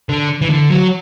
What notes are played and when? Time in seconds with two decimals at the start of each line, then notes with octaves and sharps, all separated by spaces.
0.09 D3
0.41 E3
0.50 D3
0.70 F#3